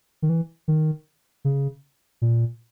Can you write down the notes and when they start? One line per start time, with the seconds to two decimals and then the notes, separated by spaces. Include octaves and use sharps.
0.22 D#3
0.29 E3
0.68 D#3
1.45 C#3
2.22 A#2